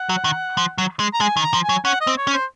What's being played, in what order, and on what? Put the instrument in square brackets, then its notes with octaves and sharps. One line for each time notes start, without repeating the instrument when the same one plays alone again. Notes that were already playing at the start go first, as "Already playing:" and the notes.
Already playing: [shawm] F#5
[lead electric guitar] F#3
D#3
F3
F#3
G#3
[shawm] A#5
[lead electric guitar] G#3 [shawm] G#5
[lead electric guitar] D#3
[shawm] A#5
[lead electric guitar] F3
[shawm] G#5
[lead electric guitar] F#3
[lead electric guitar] C#4 [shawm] F#5
[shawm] D#5
[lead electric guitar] C4
[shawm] C#5
[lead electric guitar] C#4
[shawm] C5